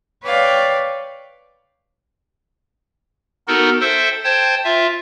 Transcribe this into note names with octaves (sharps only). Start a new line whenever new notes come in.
B4 C#5 D5 F5 G5
B3 D#4 F#4 A4 A#4
A4 C5 E5 G5
C5 G5 A5 G#6
F4 E5